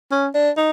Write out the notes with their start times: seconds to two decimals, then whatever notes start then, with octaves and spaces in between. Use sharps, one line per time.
0.11 C#4
0.34 D4
0.57 D#4